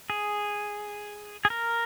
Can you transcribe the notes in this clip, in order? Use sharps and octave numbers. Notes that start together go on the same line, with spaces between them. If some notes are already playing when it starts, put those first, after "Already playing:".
G#4
G#4
A#4